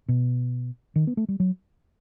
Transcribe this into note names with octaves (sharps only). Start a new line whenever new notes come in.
B2
D#3
B3
A3
G3
F#3